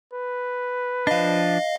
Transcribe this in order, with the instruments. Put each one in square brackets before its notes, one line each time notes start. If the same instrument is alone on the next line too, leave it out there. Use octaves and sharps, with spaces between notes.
[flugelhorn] B4
[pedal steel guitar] F3 D4 [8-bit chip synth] D#5 F5